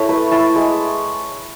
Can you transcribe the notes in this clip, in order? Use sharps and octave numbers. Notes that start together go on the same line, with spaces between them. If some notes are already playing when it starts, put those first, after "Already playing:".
Already playing: E4 A4 C#5
A3 B4
E4 A5
G#3